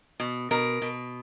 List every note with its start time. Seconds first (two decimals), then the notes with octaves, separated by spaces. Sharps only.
0.20 B2
0.51 B2 A#4
0.82 B2